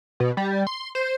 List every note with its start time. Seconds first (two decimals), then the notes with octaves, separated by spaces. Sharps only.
0.20 B2
0.37 G3
0.67 C6
0.95 C5